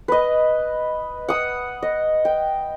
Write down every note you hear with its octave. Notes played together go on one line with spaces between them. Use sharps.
B4 D#5
F#5 D#6 E6
D#5
G5